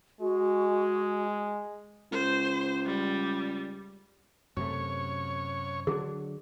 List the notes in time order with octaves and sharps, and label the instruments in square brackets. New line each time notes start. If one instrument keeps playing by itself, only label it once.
[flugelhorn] G#3 [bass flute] F#4
[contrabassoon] C#2 [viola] C5
[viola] G3
[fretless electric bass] F#2 C3 A3 [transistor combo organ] C#5
[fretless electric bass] D3 F#3 D4 [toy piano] G#4